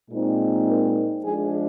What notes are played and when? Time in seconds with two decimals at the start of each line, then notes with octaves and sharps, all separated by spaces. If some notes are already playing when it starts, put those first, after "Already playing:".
0.10 A#2 G#3 C4 D#4
0.68 A#4
1.25 F3 G#3 D4 G#4